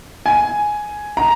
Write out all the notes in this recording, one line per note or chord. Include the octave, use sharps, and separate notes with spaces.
G#5
A#5